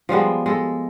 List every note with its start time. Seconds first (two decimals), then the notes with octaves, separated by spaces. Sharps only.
0.09 F3 G3 G#3 B3
0.46 G#3 A4